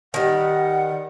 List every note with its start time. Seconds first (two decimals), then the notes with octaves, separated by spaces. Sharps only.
0.14 D#3 G3 F#5